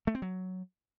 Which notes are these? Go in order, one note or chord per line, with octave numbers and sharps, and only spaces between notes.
A3
C4
F#3